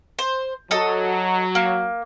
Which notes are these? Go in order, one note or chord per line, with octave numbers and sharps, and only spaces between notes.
C5
F#3 A4 D#5
A#3